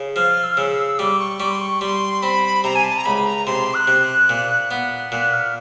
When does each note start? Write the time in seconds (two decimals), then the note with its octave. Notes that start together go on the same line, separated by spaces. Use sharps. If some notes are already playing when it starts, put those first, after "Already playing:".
Already playing: C#3
0.16 F3 F6
0.44 E6
0.52 F6
0.57 C#3 E6
0.72 E6
0.99 G3 D6
1.19 C#6
1.40 G3 D6
1.51 C6
1.61 C#6
1.81 G3 C6
2.22 C4 B5
2.64 C3 A#5
2.75 G#5
2.84 A5
2.97 A#5
3.05 C#2 B5
3.26 A#5
3.46 C3 C6
3.74 F#6
3.87 C3
4.02 F#6
4.29 A#2
4.71 B3
5.12 A#2 F#6
5.33 F6